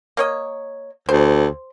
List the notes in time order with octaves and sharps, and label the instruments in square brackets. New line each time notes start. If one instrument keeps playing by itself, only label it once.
[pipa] A#3 C#5 D#5
[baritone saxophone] D2 [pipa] C5